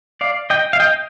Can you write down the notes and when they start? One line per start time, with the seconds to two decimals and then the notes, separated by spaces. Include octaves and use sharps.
0.21 D5 F5
0.50 D#5 G5
0.73 F5
0.80 D#5 G5